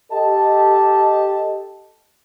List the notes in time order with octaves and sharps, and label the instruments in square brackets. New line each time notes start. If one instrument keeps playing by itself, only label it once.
[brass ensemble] G4 A4 D#5 A5